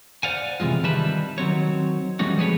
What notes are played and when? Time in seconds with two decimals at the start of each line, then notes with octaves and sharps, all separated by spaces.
0.23 C5 D5 F5 F#5 G#5
0.60 C3 E3 F#3 G#3 F4
0.84 D#3 G3 B4 E5 A5 B5
1.38 D#3 F#3 C4 C#5
2.19 E3 G3 A3 C#4 D#4 F#4
2.37 F3 G#3 G#4 A4 B4 C#5